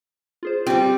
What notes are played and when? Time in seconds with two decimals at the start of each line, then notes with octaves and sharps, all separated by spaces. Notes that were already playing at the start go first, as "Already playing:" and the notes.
0.43 F4 G#4 C5
0.67 G3 C4 F4 G4